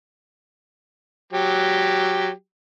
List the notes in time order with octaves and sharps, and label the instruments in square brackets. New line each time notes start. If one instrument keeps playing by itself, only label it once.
[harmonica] F#3 G4